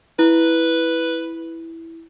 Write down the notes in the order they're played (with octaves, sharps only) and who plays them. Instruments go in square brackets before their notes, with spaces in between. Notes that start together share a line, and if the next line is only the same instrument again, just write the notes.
[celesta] E4 [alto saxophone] B4